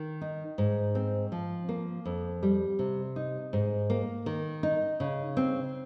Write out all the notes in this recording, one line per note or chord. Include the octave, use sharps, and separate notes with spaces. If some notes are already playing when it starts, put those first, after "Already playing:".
Already playing: D#3
D#4
G#2
C4
F3
A#3
F2
G3
C3
D#4
G#2
A#3
D#3
D#4
C#3
C4